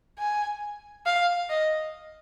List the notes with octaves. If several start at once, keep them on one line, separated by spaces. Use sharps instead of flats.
G#5
F5
D#5